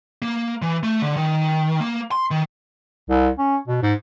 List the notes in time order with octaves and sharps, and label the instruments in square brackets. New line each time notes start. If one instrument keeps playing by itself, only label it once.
[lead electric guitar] A#3
E3
A3
D3
D#3
A#3
C6
D#3
[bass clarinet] C2
C#4
B2
G#2